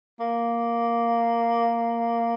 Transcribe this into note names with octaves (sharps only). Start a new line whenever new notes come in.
A#3